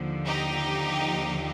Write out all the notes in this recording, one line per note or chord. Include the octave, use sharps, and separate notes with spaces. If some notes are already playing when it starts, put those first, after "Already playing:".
Already playing: D#2 D3 F3
D#4 G4